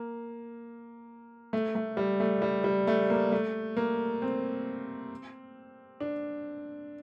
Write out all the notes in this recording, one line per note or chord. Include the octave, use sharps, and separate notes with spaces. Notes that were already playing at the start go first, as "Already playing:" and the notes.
Already playing: A#3
A3
A3
G3
A3
G3
G3
A3
A#3
A3
A#3
C4
D4